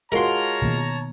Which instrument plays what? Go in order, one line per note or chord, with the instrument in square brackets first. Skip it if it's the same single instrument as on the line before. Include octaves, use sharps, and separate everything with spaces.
[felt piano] G#3 F4 F#4 [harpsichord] A#4 C6 [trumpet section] C#5 A5 A#5
[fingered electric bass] B2 D#3 A#3